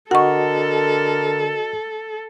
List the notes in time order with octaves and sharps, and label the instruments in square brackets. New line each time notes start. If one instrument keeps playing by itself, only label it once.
[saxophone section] D3 A#4 [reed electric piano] F#4 D#5 [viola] A4 [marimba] F#5 C#6